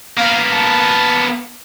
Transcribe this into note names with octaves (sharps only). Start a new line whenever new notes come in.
A#3 B3 F5
A5